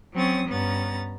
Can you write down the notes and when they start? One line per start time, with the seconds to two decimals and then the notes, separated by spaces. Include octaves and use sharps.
0.15 F#3 C4 C#4 C#6 D#6 A6
0.49 G2 B3 C#4 A#5 A6